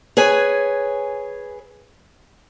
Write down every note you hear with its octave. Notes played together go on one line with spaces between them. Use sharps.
G#4 B4 C#5 G#5